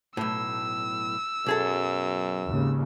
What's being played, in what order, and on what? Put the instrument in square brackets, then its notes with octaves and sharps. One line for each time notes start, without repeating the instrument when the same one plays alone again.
[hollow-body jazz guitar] B1 A2 [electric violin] E6
[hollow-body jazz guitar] B1 G#4 A4 [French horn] F#2
[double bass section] G#1 D#2 C#3